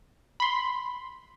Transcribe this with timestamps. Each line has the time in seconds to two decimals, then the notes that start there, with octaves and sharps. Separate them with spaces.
0.40 B5 C6